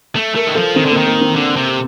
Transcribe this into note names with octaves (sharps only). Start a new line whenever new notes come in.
A3
A3 A#4
D#3
F3 A4
D#3 C4
D3
A#3
D#3
A#3
C4
D3
C3